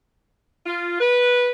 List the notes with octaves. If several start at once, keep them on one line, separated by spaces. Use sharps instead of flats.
F4
B4